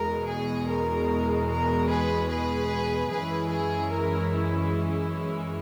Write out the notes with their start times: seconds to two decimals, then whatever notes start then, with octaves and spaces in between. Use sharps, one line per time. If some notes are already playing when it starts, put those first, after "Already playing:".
Already playing: E2 B2 G#3 A#4
0.27 G#4
0.67 A#4
1.48 A#4
1.88 G#4 B4
2.29 G#4 B4
3.09 F#2 E3 G#3 C#4 E4 G#4 B4
3.50 G#4
3.90 A#4